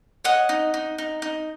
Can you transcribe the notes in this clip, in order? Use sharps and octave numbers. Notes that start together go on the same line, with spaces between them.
C#5 D#5 F#5
D#4
D#4
D#4
D#4